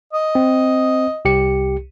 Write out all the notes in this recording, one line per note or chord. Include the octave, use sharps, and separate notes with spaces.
D#5
C4
C2 G4 C#7